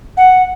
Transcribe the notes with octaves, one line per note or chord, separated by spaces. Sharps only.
F#5